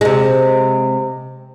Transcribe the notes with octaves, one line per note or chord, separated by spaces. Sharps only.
C3 G#3